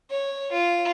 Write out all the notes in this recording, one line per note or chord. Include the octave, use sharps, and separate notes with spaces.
C#5
F4